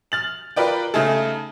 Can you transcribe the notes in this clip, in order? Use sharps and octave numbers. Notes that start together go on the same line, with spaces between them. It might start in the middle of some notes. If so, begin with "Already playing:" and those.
F6 A6 F#7
F4 A#4 B4 D5 G5
C#3 A3 D#4 G#4 A4